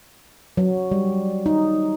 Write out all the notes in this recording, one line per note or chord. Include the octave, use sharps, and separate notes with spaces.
F#3
G3
D#4